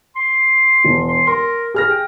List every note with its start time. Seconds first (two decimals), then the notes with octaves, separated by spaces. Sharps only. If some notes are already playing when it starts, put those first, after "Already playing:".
0.16 C6
0.84 E1
1.08 C6
1.27 A#4 C6
1.74 G#4 F6 A#6
1.90 G5